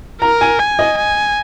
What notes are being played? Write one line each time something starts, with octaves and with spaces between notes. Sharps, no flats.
A#4 A#5
G#5
G#5
D#5
G#5